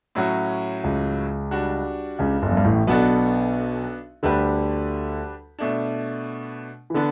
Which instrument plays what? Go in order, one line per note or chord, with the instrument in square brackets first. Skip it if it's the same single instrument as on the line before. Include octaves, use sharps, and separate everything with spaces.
[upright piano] A2 F#3 C#4 F#4
[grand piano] C#2 C#3
[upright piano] G3 D4 F#4
[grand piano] C#2 C#3
G1 G2
F#2
G2
A1 A2
[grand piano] B1 B2 [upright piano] B3 D4 F#4 A4
[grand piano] D2 D3 [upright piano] G3 D4 G4 B4
[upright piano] B2 A3 D4
[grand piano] E3
[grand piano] D3 [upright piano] B3 D4